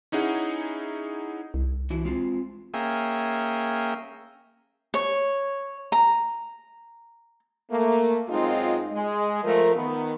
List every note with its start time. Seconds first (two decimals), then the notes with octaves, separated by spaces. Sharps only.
0.12 C#4 D#4 E4 G#4 F#5
1.54 C2
1.90 E3 E4 F#4
2.05 G#3 C4 F4
2.74 A#3 C#4 G#4 E5 F5 G5
4.94 C#5
5.92 A#5
7.71 A3 A#3
8.29 F#2 G#3 C4 D#4 F4
8.93 G#3
9.44 F3 A3 A#4
9.76 D#3 B3